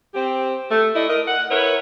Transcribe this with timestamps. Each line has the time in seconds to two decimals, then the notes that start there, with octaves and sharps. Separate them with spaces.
0.15 C4 G4
0.70 A3
0.95 A3 E4 D5 D#5
1.08 A#4 D#5
1.26 F#5
1.49 E4 A#4 B4 C#5